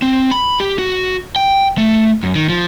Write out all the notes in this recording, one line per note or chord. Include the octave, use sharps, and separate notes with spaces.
C4
B5
G4
F#4
G5
A3
F#2
D#3
F3